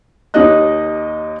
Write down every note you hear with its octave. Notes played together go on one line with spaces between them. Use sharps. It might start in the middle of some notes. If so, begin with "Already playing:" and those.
D#2 D#4 G4 C#5 D#5 F#6